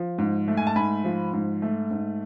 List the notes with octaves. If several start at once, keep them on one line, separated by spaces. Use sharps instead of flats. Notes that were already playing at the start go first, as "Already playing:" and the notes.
Already playing: F3
G#2
A3
G#5
A5
G#2 G#5 B5
F3
G#2
A3
G#2